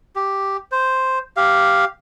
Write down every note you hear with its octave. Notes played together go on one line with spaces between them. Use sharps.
G4
C5
G4 F5